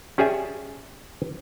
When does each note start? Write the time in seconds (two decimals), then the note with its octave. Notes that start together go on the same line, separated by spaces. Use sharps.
0.18 C#4 G4 G#4 D5 E5 G#5